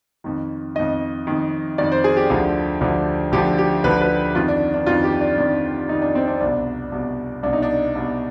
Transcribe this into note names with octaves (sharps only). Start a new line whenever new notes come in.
F2 D#3
F2 D#3 D#5
F2 D#3
F2 D#3 D5
C5
G#4
G4
D2 D3 F3
D2 D3 F3
D2 D3 F3 G4
G4
D2 D3 F3 B4
B4
F2 D#3 F4
D4
D4
F2 D#3 F4
G4
D4
F2 D#3 D4
F2 D#3 D#4
D4
C4
D4
C2 B2 D4
C2 B2
C2 B2 D4
D#4
D4
C2 B2